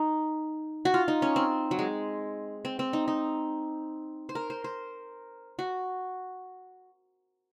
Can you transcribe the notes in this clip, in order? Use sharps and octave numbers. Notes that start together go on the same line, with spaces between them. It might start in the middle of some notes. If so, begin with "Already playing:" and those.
Already playing: D#4
F#4
F4
D#4
C#4
C4
F#3
G#3
C4
C4
D#4
D#4
C5
A#4
C5
C5
F#4